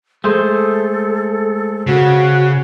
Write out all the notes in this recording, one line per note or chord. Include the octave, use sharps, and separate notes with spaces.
G#3 A3 G#4 A4 C5
C#3 F#4